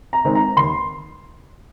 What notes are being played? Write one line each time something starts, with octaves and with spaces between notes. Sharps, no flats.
A#5
D#3 G#3 C4
A#5
D#2 C6